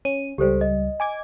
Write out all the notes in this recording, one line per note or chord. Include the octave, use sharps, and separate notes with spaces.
C#4 D#7
C#2 G3 G4 A4 C5
D#5
G#5 D6 G#6